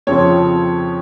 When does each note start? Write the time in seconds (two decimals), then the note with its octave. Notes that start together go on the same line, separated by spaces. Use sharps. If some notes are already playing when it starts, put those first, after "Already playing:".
0.07 F2 C#3 F3 C4 C#5